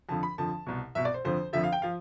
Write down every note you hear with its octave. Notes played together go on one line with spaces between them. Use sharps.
F2 D3 F3 A5
B5
F2 D3 F3 A5
C2 B2
C2 B2 E5
D5
C5
F2 D3 F3 C5
F2 D3 F3 E5
F5
G5
F3 F5